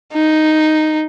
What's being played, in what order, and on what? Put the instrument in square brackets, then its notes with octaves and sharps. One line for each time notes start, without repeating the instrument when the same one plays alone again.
[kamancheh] D#4